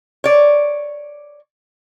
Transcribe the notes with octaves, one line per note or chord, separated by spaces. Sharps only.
C#5 D5